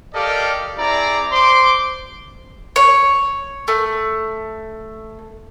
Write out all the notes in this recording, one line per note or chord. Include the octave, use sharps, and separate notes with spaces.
G4 A4 A#4 D5 D#5 F5
C4 E4 G#4 D5 A#5
C5 C6 D6
C#5
A3